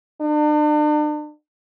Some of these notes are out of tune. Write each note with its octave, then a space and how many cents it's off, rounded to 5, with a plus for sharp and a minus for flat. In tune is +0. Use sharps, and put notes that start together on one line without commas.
D4 +40